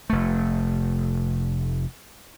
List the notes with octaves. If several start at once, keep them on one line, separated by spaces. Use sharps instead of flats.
F1 A3